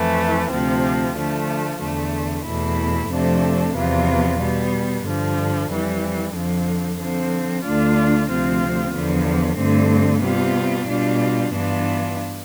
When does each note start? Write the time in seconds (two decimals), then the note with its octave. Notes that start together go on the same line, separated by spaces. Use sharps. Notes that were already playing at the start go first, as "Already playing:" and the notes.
Already playing: F2 E3 A3
0.50 D2 C3 F3 C4
1.15 D3 F3 A3
1.80 E2 D3 A3
2.45 E2 B2 A3 E4
3.10 F2 C3 F3 A3 D4
3.75 E2 C3 F3 B3 F4
4.39 B2 G3 B3
5.04 G2 D3 F3
5.69 F2 E3 G3
6.33 F2 D3 F3
6.98 D3 F3 C4
7.63 D2 D3 A3 D4 F4
8.28 D2 C3 F3 C4 F4
8.93 E2 D3 F3 B3
9.57 G2 D3 A3 C4
10.22 C3 G3 B3 F4
10.87 B2 G3 D4 F4
11.52 G2 E3 B3 D4 F4